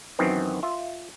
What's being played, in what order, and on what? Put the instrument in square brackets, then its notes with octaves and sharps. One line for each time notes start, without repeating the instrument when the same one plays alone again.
[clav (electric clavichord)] F#2 D#3 E3 F#3 B3 C4
F4 E5